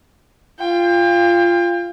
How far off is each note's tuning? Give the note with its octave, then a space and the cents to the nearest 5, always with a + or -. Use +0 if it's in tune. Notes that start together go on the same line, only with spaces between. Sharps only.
F4 -10 G5 +30